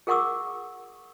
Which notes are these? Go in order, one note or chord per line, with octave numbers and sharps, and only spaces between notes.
G#4 A#4 F#5 C#6 D6 E6